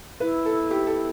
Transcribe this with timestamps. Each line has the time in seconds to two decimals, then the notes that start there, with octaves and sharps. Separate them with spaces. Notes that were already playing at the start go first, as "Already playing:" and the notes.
0.20 E4 B4
0.45 A4
0.71 G4
0.87 A4